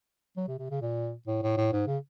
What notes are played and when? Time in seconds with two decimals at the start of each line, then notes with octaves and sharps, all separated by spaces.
0.37 F#3
0.48 C3
0.59 C3
0.71 C#3
0.81 A#2
1.27 A2
1.43 A2
1.57 A2
1.73 G#2
1.87 C#3